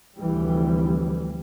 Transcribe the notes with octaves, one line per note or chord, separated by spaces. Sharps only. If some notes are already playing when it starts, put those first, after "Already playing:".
F1 D2 E3 G3